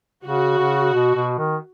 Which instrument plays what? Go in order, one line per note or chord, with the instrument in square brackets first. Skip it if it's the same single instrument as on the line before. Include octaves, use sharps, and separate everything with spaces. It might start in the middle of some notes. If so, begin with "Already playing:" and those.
[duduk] C#3 [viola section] F#4
[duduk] C#3
B2
B2
D#3